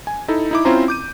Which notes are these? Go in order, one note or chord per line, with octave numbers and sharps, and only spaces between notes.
G#5
D#4 E4 A4
D#4 E4 D6
C4 C#4 E4 F4 C5 A#5
D6 G6 D#7